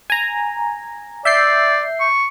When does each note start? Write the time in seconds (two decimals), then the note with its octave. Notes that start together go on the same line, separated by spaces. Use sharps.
0.10 G#5 A#5
1.25 D5 E5 G6 C7
2.00 C#6